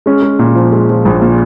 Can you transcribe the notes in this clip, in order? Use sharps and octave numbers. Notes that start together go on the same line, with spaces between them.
G#3 C#4
G#3
A#2
F3
G#3
F3
A#1
A#2